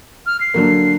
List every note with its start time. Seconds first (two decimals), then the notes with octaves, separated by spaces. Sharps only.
0.26 F6
0.41 C7
0.54 D3 F#3 A#3